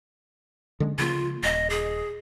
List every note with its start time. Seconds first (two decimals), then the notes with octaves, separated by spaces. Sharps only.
0.80 D3 G#3 C#4
0.98 C#3 F3 A#3 F4
1.43 D#1 D#5
1.70 G#4